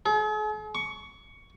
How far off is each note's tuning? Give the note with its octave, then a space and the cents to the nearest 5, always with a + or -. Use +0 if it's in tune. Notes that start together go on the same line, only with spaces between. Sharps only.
G#4 +45
C#6 +15